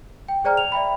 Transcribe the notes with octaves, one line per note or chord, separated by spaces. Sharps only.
G5
G#4 C5 D5 G5 A#5 F6
F7
D5 E5 G5 B5